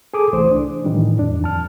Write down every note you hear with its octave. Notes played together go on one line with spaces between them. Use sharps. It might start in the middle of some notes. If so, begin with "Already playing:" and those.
G#4 A4 D6 D#6
C2 E3 A3 C5
D4
A2 D#3 E3 G3 D4
E2 D4
F2 A5 F6